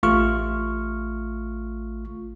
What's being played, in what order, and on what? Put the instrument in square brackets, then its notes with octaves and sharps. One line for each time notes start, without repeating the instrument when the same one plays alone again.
[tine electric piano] A1 A3 F4 C#6 F6